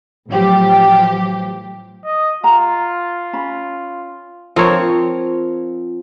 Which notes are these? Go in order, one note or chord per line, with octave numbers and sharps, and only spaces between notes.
A1 F3 F#3 G4
D#5
F4 F#5 A#5
C#4 B5
F3 C4 F4 A#4 C#5